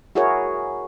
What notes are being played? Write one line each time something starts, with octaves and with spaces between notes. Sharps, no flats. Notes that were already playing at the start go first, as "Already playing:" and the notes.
E4 F#4 G#4 A#4 C#5